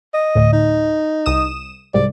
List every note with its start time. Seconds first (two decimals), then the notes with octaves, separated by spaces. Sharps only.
0.14 D#5
0.35 D2 A2
0.53 D#4
1.26 C2 D#6 E7
1.94 C2 G#2 D5